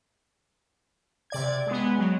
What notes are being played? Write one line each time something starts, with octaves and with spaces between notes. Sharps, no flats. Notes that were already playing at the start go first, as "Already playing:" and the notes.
C3 D5 G#6
G#3 B3
F#3